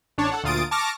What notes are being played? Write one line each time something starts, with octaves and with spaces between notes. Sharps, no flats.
A1 D4 C#5 A5
A4 F#5
D2 A#2 F4 D#6 A6 D7
A5 C#6 D6 F6 A#6